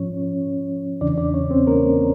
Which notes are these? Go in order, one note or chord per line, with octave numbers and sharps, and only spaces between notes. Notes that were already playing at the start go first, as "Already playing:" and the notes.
Already playing: G#2 F3 C#4 C#5
E2 C#3 E3 D4 D5
D4 D5
C#4 C#5
C4 C5
A#3 A#4